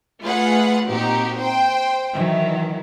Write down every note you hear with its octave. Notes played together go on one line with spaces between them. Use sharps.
A3 F4 G#4 B4 F#5
A#2 C4 D#4 F#4 G4
C5 G5
D#3 E3 F#3